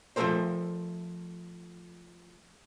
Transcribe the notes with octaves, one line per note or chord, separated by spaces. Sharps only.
F3 A3 C#4 A4 A#4 C5